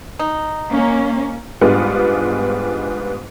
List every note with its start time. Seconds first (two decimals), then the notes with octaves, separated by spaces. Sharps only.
0.19 D#4
0.73 A#3 C#4
1.61 G#2 G3 G#3 B3 D4 F4